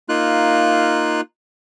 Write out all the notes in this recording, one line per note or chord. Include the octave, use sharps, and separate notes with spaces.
A#3 D#4 F4 F#6